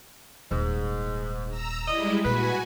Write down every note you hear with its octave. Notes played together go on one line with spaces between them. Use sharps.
D#1 G#2
A#5 E6
G3 G#3 E4 D5 D#5
A#2 F#4 B4 G#5